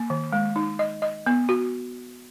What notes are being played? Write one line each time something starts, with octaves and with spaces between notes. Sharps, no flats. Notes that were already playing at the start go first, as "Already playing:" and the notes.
Already playing: A#3
D#3
G#3
D#4
D#5
D#5
B3
F#4